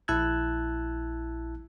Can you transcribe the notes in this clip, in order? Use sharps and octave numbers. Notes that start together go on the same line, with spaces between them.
A#1 E4 A5 E6 F#6 G#6